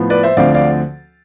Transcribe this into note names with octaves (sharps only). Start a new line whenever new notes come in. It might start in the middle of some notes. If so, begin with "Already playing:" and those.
Already playing: A2 F3 B3
B4 D5
C5 E5
D2 D3 F3 C4 D5 F5
D5 F5